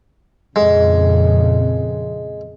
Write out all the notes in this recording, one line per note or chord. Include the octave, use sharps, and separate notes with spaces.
F2 A#2 C#3 G#3